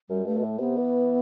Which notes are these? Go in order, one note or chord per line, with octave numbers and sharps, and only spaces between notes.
F#2 G3
G2 A3
B2
A2
C3 B3
E3